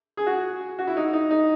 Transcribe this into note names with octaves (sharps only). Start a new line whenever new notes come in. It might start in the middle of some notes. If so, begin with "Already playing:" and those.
G#4
F#4
F#4
E4
D#4
D#4
D#4